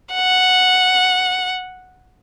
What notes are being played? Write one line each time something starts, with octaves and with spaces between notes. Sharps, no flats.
F#5